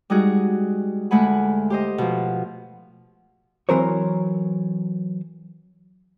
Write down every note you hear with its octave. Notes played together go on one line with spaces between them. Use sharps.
G3 G#3 D#4 F#4 G#4 F#6
D2 G#3 A3 F#5 G#5 B5
G4 C5 D#5
B2 F3
E3 F#3 C4 A#4 C5 C#5